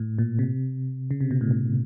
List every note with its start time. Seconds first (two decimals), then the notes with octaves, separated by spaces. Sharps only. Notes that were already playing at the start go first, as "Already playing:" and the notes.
Already playing: A2
0.18 A#2
0.39 C3
1.11 C#3
1.21 C3
1.31 B2
1.41 A2